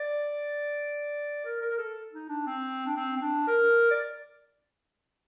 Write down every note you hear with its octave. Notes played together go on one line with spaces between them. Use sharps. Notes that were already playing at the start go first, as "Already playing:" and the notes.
Already playing: D5
A#4
A#4
A#4
A4
D#4
D4
C4
D4
C4
C4
D4
A#4
D5